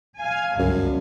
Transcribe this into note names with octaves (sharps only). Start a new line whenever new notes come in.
F5 G#5
G1 C#2 F#2